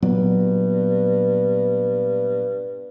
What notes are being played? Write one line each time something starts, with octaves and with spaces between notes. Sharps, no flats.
G2 A#2 F#3 B3